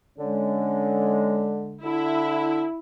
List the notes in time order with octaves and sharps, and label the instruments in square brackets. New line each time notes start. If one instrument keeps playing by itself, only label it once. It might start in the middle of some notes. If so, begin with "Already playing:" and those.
[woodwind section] D3 G#3 [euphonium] C#4
[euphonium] D3 [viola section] E4